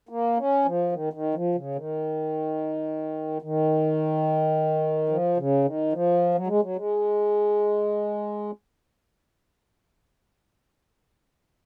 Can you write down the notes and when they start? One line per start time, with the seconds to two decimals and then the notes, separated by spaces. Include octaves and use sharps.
0.09 A#3
0.38 C#4
0.65 F3
0.92 D#3
1.13 D#3
1.34 F3
1.55 C#3
1.76 D#3
3.42 D#3
5.09 F3
5.37 C#3
5.64 D#3
5.93 F3
6.35 F#3
6.47 G#3
6.62 F#3
6.76 G#3